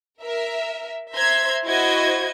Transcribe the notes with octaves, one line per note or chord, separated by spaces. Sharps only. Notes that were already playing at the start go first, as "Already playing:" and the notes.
A#4 E5
C5 E5 A#5 C6 G#6
E4 F#4 C5 D#5 G#6